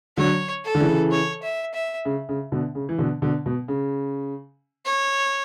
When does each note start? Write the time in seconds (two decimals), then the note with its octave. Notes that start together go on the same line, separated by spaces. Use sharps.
0.17 D3 F#3 C#5
0.65 A4
0.75 D3
0.80 C#3 E3
1.11 C#5
1.43 E5
1.74 E5
2.05 C#3
2.29 C#3
2.52 B2 D3
2.75 C#3
2.89 E3
2.98 B2 D3
3.22 B2 D3
3.46 B2
3.68 C#3
4.85 C#5